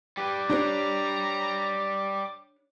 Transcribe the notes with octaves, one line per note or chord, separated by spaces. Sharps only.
G3 G4 B4 D6
D4 G4 C#5 A#5